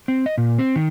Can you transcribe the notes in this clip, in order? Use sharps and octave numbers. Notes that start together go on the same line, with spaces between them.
C4
D#5
A#2
C4
D#3